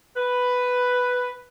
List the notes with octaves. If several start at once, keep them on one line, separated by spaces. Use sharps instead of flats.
B4